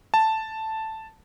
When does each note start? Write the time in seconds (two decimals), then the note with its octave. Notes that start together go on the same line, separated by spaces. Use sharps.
0.14 A5